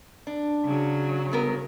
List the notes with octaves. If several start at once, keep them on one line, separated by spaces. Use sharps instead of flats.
D4
C#3 F#3
G2 B3 A#4